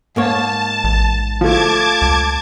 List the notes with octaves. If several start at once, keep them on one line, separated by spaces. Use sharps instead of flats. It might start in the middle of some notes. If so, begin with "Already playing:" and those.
G#2 A#3 C#5 A5
A1
F3 A3 A5 D6 G#6
C#2